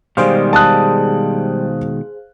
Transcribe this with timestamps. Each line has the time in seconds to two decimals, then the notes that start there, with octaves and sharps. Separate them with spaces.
0.17 B2 D#3 G3 G#3 G#4 C5 F5
0.53 A5 D#6 F#6